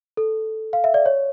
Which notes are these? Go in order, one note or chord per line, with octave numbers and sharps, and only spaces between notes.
A4
F5
E5
D5
C#5